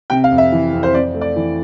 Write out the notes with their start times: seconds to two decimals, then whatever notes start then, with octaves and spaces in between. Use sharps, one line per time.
0.10 C3 G5
0.24 F5
0.31 F2
0.38 E5
0.52 E3
0.73 F2
0.83 C5
0.94 F2 D5
1.14 A3
1.21 D5
1.36 E3